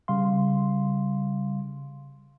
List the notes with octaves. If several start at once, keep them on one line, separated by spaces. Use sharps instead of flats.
C#3 G3 F5 C6